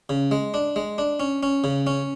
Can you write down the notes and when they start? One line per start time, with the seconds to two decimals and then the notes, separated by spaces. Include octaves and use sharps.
0.09 C#3
0.31 G#3
0.54 D4
0.76 G#3
0.98 D4
1.20 C#4
1.43 C#4
1.64 C#3
1.87 C#4